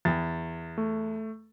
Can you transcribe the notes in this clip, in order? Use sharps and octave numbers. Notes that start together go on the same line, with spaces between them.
E2 A6
A3